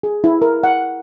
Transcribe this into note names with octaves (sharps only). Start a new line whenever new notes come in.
G#4
E4
A#4
F#5